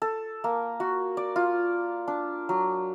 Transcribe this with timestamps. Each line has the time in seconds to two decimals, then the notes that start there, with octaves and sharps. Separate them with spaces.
0.02 A4
0.44 A#3
0.80 F#4
1.17 D5
1.36 F4
2.08 D4
2.49 F#3